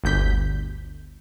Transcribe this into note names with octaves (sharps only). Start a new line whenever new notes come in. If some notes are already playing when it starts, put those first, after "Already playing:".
G1 D2 G6 B6